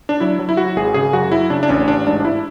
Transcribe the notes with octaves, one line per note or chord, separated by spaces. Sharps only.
D4
F#3 E4
F#3
E4
F#3 F#4
G#1 G#4
C#3 G#4
F#2 F#4
F#3 E4
C#3 D4
D4
A1 C#4
A1 D4
G#2 D4
D4
E4